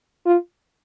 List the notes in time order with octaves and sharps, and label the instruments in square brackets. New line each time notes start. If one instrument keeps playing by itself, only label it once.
[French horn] F4